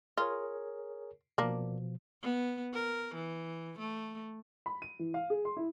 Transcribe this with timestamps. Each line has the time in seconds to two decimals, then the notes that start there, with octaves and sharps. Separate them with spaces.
0.17 F4 G#4 A#4 C#5
1.38 B2 F3 A#3 D4
2.22 B3
2.74 A#4
3.15 E3
3.79 A3
4.66 B5
4.82 D#7
4.99 E3
5.14 F5
5.30 G#4
5.45 C6
5.57 E4